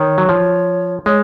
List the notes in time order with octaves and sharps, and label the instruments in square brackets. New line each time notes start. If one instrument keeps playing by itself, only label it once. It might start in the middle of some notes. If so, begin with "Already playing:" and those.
Already playing: [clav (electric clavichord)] D#3 [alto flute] C#5
[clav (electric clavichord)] F#3
F3
[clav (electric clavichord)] G#3 [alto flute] C#5